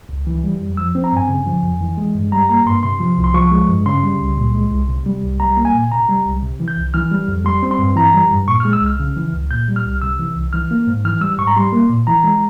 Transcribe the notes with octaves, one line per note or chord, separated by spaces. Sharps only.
C#2
E3
G3
F2
F3 E6
C4
A#5
G2 G#5
C#3
F3
F2
E3
G#3
G2
G3 A#5
A#3 A#5
G2 C6
C3 C6
F3
C2
C6
F3 C#6
G#3
G2
C#3 C6
G3
C#2
A#2
G#3
C2
C3
G3
C2
G3 A#5
A#3
G#5
A#2
C3 A#5
G3
C2
C3
E3
G6
C2
E3 F6
G3
F2
G3 C6
C4
C6
G2
E3 A#5
G3
G2
A#2 C#6
F6
G#3
E6
C2 F6
C#3
E3
C#2
A#2 G6
G3
F6
C2
C3 E6
E3
C2
E3 F6
A#3
G#2
E3 F6
G3 E6
G#2 C#6
A#5
G3 C6
A#3
A#2
E3 A#5
G#3